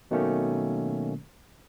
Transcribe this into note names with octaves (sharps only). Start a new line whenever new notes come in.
B2 D#3 F#3 A3 A#3 C#4